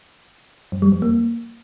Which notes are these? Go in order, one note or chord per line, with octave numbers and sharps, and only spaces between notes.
F#2
G3
F2
A#3